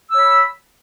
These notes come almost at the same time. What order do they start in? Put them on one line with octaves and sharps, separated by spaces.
E6 C#5 B5